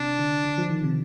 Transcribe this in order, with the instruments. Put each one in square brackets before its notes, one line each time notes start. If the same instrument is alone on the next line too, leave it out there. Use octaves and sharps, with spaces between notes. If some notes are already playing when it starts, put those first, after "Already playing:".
Already playing: [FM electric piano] C3 [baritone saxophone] D4
[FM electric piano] D3
D3
F3
D#3
C3